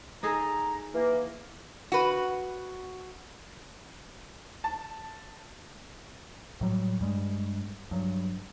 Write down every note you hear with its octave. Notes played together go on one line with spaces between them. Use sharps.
D#4 G#4 A4 A#5
E3 A#3
F#4 B4
A5
A2 F#3 G3
G2 G3 G#3
G2 F#3